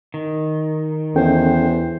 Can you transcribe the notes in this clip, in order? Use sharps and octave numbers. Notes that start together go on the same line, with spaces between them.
D#3
E2 C#4 A4 C5 G5